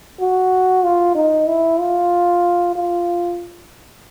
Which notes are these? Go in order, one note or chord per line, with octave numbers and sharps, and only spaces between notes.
F#4
F4
D#4
E4
F4
F4